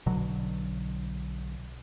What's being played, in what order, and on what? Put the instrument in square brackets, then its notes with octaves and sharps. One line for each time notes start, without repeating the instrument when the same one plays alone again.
[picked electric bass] B1 B2 D3 F#3